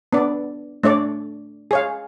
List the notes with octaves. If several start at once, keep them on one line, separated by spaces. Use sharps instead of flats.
B3 D4 D5
A3 D4 C#5 D5
G#4 C#5 F5